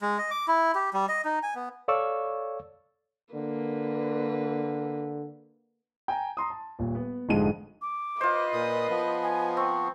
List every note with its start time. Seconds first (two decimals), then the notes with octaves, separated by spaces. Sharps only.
0.02 G#3
0.18 D#5
0.31 D6
0.48 E4
0.75 G4
0.93 G3
1.09 D#5
1.25 D#4
1.43 G#5
1.55 B3
1.88 A4 C#5 D5 F5 C#6 E6
3.35 D3 A#3 B4
6.08 G5 G#5 A#5
6.37 A#5 C6 D#6
6.50 A5
6.79 D#1 A#2
6.95 B3 B4
7.29 F1 G#2 D3 F3 G#3 D#7
7.82 D6
8.21 F4 B4 C5 D#5
8.53 A#2 A#4 D#6
8.90 F3 B3
9.23 G#5
9.57 C4 C#6